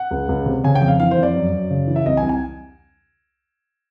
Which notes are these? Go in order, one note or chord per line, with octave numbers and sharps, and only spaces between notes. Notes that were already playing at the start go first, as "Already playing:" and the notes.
Already playing: F#5
C#2
C#2
C3
C#3 G#5
G5
F2
F5
E3 F5
C5
F2
D5
F#2
F#2
C#3
E3
E5
C2 D#5
G#5
C2
G#5